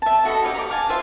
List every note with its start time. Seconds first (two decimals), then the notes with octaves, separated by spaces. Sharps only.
0.02 E5 A5
0.25 F#4 A4 D#5 B5
0.43 G4 D#5 F5 G#5
0.54 A#5 B5 D6
0.71 F5 G#5 A5
0.89 F4 C5 E5 F5